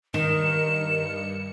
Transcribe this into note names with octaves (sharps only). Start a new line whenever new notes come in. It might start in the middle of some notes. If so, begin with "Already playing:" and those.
G2 D#3 A#4 C#7 E7